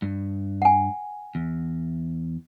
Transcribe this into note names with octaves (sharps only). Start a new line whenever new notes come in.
G2
F#5 G#5
E2